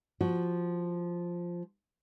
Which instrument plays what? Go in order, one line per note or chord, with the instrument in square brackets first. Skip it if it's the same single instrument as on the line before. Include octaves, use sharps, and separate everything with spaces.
[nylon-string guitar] F3 F#4